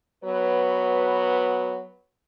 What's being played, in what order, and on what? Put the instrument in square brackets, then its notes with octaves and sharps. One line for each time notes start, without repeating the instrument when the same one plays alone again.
[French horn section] F#3 B3 B4